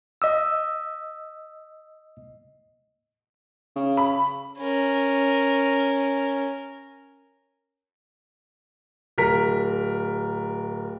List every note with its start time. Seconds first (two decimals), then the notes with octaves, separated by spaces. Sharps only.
0.22 D#5 D#6 E6
3.76 C#3
3.97 B5
4.58 C#4 A#4
9.18 D1 A#4 B6